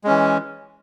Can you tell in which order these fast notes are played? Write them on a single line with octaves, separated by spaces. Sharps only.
G#3 C#4 E3